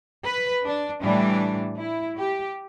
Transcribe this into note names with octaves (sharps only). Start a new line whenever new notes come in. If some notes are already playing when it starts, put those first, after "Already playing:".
B4
D4
A2 E3 G3 D4
E4
G4